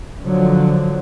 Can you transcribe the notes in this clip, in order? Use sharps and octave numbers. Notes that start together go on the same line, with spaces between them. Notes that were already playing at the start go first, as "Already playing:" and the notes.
D3 F3 F#3